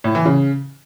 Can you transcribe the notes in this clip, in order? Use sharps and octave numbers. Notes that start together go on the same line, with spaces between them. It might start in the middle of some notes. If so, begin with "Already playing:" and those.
A2
E3
C#3